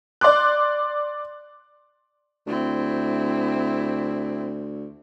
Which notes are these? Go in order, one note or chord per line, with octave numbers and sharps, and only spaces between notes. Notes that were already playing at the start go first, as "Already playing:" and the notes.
D5 C6 D6 F#6
D2 C4 E4